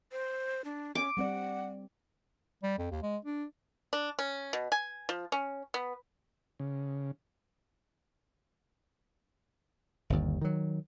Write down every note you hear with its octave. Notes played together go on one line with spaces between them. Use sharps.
C5
D4
C#4 D6
G3 C4 D5 F#5
G3
F2
D#2
G#3
D4
D4
C#4
B2
G#5
F3
C#4
B3
C#3
G1 D#2
D#3 F#3